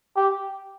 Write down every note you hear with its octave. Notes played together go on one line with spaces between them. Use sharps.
G4